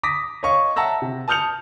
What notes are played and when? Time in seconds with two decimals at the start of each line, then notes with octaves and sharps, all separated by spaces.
0.03 D6 D#6 A#6 B6
0.43 C#5 D#5 F5 C#6
0.76 E5 F#5 A5 A#5 E6 A#6
1.02 C3
1.28 A5 D#6 F6 G6 C#7 F7